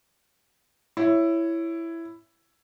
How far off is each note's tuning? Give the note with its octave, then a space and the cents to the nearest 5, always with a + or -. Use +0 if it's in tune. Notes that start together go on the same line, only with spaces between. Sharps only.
E4 +10 C#5 +0